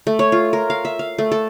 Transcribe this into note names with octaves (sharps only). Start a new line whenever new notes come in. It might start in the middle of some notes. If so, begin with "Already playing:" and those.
A3
C#5
F4
A#4
F5
E5
F5
A3
A4